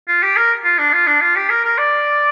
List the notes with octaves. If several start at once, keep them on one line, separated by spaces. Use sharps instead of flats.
F4
G4
A#4
F4
D4
F4
D4
F4
G4
A#4
A#4
D5